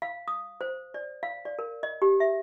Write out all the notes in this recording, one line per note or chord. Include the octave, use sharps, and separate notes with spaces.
F5
D#6
C5
D5
F5
D5
A#4
D#5
G4
E5